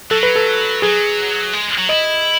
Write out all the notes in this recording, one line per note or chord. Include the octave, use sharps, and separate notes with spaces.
F#3 A4
B4
A4
F#3 G#4
G#3
F#3
E4 D#5